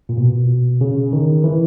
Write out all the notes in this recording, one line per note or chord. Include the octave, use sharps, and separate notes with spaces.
A#2
B2
C#3
D#3
E3